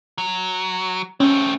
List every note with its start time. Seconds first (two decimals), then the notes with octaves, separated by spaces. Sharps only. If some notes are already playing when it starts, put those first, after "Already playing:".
0.18 F#3
1.20 A3 C4 C#4